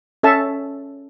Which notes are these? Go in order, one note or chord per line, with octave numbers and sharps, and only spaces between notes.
C#4 A4 E5 A5